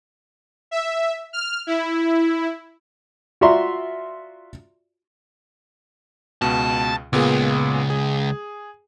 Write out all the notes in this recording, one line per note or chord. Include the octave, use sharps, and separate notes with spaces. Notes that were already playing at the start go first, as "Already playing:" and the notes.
E5
F6
E4
F4 F#4 D5 E5 A#5 C6
C#2 B2 A5
C#2 A#2 B3 G#4
G#4